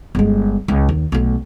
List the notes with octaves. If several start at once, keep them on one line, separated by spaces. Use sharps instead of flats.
G1 G#3
C#2
D#2
B1 A3